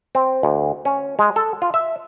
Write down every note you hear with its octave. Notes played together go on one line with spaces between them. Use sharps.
C4
D2
C#4
G#3
A4
F4
E5